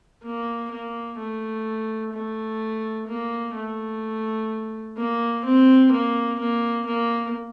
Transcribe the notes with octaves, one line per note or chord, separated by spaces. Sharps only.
A#3
A#3
A3
A3
A#3
A3
A#3
C4
A#3
A#3
A#3